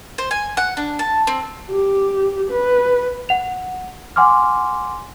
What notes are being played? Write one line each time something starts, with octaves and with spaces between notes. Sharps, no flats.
C5
G#5
F#5
D4
A5
C4
G4
B4
F#5 F7
F#5 G#5 C6 D6 F6